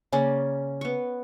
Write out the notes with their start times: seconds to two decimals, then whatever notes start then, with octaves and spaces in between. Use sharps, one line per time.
0.12 C#3 A#3 C#4 D5
0.81 B3 C#6